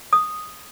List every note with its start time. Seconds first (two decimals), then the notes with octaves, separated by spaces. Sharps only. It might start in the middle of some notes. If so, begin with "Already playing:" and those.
0.13 D#6